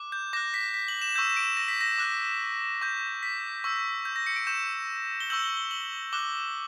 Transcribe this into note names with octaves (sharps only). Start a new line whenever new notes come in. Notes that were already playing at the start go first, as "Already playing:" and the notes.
Already playing: D6 F#6
G6
D6 F#6 A#6
B6
B6
F#7
E7
C#6 E6 G6 E7
E7
D7
E7
A#6
B6
A#6
D6 F#6
C#6 G6
B6
C#6 E6 G6
G6
A#6
C#7
D7
C#6 G6 E7
G7
C#6 E6 G6 F#7
G7
G7
F#7
D6 F#6 G7